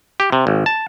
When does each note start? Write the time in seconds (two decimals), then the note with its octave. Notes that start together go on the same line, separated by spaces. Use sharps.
0.20 G4
0.32 C3
0.47 G#1
0.66 A5